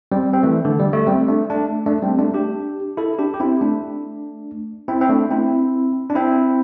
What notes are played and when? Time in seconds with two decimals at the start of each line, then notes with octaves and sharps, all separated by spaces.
0.12 G3 C4
0.33 C4
0.43 E3 A3
0.65 D3
0.79 G3
0.93 A3
1.07 G3 C4
1.28 A3 D4
1.50 A3 D4
1.86 A3 D4
2.02 G3 C4
2.19 A3 D4
2.34 D4 G4
2.97 E4 A4
3.19 D4 G4
3.34 G4
3.40 C4 E4
3.61 A3 D4
4.88 C4 E4
5.01 C4
5.09 A3 D4
5.31 C4 E4
6.10 D4
6.15 C4 E4